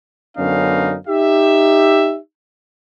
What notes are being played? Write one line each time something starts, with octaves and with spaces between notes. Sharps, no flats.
F#2 D3 B3 C#4 D#4 F5
D#4 G4 E5